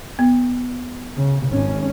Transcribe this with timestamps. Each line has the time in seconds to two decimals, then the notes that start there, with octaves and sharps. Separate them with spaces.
0.19 B3
1.17 C#3
1.46 G#1 C#4